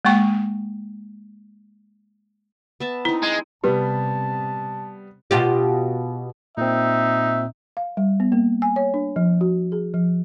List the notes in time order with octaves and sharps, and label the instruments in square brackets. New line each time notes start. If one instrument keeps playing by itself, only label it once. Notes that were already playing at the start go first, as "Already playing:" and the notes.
[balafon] G#3 A#3 G5 C#6
[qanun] B3 E5 A5
[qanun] C4 D#4 [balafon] E4
[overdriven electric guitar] G#3
[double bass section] C3 [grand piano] G3 B3 [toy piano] G4 B4 [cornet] A5
[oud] B2 F4 G4
[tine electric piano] A#2 C4 [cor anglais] D#4 [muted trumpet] E5
[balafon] F5
G3
B3
A#3
G#5
C#5
D4
F3
F#4
G#4
F3